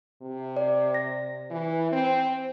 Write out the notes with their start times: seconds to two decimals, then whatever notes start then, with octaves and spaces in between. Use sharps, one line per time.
0.22 C3
0.57 D5
0.94 A#6
1.50 E3
1.92 C4